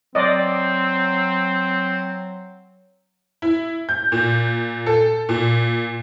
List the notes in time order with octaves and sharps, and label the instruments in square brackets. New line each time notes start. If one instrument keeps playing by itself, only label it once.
[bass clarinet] F#3 [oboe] C4 [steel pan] D5 D#5
[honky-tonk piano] E4
G6
A#2
A4
A#2